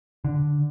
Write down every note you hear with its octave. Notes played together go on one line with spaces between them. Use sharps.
D3